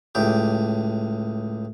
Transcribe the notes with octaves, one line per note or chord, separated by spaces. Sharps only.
C#2 A2 G4